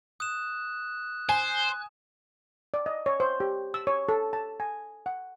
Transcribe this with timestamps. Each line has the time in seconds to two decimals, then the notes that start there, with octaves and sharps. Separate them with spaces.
0.20 D#6 F#6 E7
1.29 C5 G#5
2.74 D5
2.86 D#5
3.06 C#5
3.20 C5
3.40 G4
3.74 E6
3.87 C#5
4.09 A4
4.33 A5
4.60 G#5
5.06 F#5